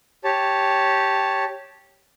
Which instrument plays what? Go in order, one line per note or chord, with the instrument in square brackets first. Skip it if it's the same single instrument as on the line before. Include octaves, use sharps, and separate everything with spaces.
[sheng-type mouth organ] G4 C#5 A5